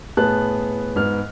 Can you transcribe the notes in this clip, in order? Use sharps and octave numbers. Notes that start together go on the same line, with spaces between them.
A2 B3 G#4 A5 F#6
G#2 B3 F6